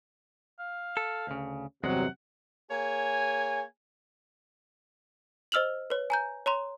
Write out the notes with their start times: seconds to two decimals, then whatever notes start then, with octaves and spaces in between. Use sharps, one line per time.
0.59 F5
0.97 A4
1.27 D2 C#3
1.84 E2 G2 C3 F#3 G#3 F#5
2.71 A#3 G#4 C#5 G#5
5.52 C5 D#5 E6 F6 F7 F#7
5.90 B4 C#5
6.10 G#5 A#5 G6
6.46 C#5 A#5 C6